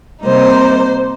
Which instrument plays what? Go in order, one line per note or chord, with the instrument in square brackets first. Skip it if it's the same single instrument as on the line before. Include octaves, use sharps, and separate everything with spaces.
[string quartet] C3 G3 A#3 D#4 C5